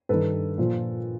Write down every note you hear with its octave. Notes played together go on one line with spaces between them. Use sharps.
G2 D#3 A4 B4
A#2 F3